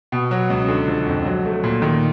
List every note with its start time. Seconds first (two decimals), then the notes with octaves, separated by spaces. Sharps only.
0.12 B2
0.31 F#3
0.50 C#2
0.68 D3
0.88 F3
1.06 F2
1.25 F#3
1.45 A3
1.64 A#2
1.82 D#3